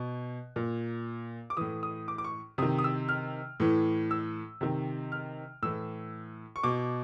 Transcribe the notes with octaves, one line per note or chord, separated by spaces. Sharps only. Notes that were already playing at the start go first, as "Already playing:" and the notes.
Already playing: B2
A#2
D6
A2 E3 D#6
D#6
D6
D6
C#6
C3 D#3 D#6
D#6
E6
F6
A2 E3
E6
C3 D#3
F6
A2 E3 E6
C#6
B2 D6